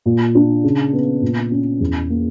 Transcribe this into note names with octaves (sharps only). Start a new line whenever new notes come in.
A#2
D4
C#3
B3
A#2
C#4
E2
A#3